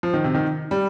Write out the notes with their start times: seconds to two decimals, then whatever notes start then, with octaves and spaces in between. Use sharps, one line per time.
0.03 F3
0.14 D#3
0.24 C3
0.35 D#3
0.71 G3